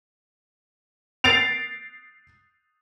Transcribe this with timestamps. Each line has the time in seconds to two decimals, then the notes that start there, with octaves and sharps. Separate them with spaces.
1.24 A6 C7 D7 F7